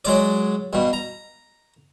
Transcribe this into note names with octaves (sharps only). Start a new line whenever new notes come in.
F#3 G#3 D5
G2 B2
A#5